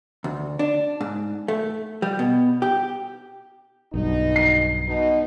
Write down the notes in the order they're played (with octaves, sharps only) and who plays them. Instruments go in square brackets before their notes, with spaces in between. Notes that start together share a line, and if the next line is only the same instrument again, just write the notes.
[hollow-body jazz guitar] D2
D4
G#2
A3
G3
B2
G4
[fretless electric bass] B1 G2 [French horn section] B2 D#4
[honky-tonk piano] C7
[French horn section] B2 D#4